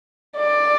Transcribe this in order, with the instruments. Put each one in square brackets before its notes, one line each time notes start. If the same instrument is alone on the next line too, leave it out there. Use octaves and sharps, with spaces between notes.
[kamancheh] D5